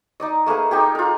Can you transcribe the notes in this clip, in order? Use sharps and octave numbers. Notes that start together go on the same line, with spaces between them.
D#4 D5 D#5
A3 A#3 G#4 B4
A3 D#4 G4 G#4
F4 A#4